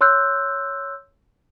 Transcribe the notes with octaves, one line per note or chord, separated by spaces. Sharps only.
C#5 C6 E6 F#6 G6